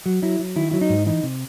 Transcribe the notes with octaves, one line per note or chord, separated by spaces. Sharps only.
F#3
F#3 E4
F#3
D#3 E4
F#3 E4
D#4
G#2
E3 D#4
C3